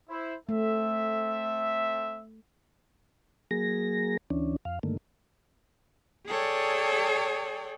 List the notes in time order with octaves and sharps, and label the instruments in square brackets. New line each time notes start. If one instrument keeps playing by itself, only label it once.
[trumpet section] E4 C5
[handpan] A3 [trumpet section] C4 A4 E5
[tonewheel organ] F#3 A#3 G#4 A#6
D2 E3 C#4 D4
F2 F5
G2 D3 D#3 A3 A#3
[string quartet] G#4 A4 C#5 D5 G5